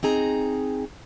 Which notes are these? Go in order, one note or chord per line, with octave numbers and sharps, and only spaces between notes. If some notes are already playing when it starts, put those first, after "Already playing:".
C4 D#4 G#4 A#5